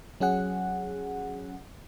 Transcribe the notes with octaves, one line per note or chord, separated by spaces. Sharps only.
F#3 C#4 G#4 F#5